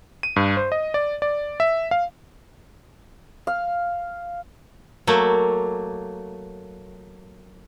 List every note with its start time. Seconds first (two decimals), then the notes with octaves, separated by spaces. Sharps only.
0.23 D#7
0.36 G2
0.57 C5
0.72 D#5
0.94 D5
1.22 D5
1.60 E5
1.91 F5
3.47 F5
5.07 F#3 A3 A#3